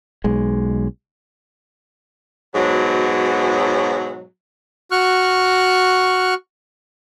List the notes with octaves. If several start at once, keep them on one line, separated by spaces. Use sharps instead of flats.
B1 G#3
G#2 B2 F#3
F#4 C#6 F6 F#6